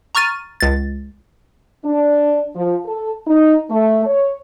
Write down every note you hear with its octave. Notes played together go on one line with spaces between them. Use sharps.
A#5 C#6 F6 A6 D#7
C#2 A6
D4
F3
A4
D#4
A3
C#5